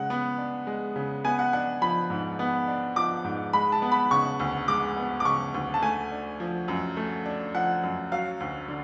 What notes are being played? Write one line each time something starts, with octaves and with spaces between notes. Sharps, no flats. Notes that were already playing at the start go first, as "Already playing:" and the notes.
Already playing: C#3 G#3 F#5
B3
D4
G#3
C#3
B3 G#5
F#5
D4 F#5
F3 B5
G#2
B3
D4
F3 D6
G#2
G#3 B5
A5
B3
B5
C#3 C#6
D2
G#3 D6
B3
D6
C#3 C#6
D2
A5
A3 G#5
D4
F3
F#2
A3
D4
F3 F#5
F#2
F#3 F5
D2
D3